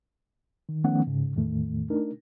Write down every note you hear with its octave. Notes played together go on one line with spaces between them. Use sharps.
D#3
D#3 F3 A3 B3 C#4 F#5
G#2 C#3
E2 A2 D#3 A3
A3 D4 D#4 A#4